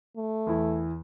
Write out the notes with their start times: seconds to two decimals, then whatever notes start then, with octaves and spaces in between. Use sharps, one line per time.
0.17 A3
0.47 E2 E4